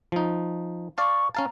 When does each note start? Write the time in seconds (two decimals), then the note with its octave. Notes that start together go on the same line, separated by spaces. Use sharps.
0.12 F3 D#4
0.98 D5 F5 A5 C#6
1.35 C#4 F5 A5 A#5